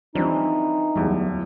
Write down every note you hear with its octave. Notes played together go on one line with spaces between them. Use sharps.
E3 F3 G3 C4 D4 D#4
D1 E2 G3